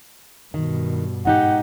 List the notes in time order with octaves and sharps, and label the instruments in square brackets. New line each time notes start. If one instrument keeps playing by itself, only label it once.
[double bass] G2 B2 [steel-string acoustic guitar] D#3
[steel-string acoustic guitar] G#2 D#4 G4 [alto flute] F#5